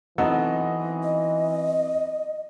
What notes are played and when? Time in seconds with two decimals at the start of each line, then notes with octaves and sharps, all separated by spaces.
0.18 E3 F#3 B3 C4 D#4 F#4 A4
1.03 D#5